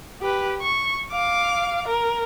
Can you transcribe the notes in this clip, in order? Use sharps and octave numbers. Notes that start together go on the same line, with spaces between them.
G4 B4
C#6
F5 D6
A#4